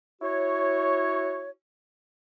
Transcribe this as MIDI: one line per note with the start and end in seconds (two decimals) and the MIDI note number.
0.22 1.50 64
0.22 1.50 66
0.22 1.50 73